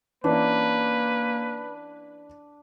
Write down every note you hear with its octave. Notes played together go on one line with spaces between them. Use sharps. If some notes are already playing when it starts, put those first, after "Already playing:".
E3 A#3 C#4 D4 B4